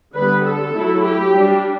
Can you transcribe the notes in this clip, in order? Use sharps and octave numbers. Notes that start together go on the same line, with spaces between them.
D3 G3 B3 B4
A4
F#3 A3 E4
G4
G3 D4